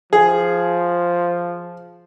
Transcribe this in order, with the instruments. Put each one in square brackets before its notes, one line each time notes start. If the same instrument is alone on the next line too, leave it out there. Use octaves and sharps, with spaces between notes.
[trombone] F3 [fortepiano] G#4